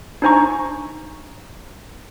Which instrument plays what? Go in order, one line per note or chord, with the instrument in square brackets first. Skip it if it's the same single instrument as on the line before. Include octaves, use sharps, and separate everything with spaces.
[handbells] D4 D#4 C5 G#5 A#5 C#6